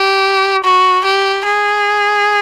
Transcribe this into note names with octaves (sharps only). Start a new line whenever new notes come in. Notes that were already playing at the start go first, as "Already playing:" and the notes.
Already playing: G4
F#4
G4
G#4